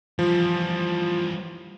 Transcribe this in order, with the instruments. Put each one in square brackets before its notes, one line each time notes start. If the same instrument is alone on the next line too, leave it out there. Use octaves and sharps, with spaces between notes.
[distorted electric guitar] E3 G3 [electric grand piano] F3